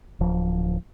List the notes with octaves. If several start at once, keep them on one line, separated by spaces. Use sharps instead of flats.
D1 F3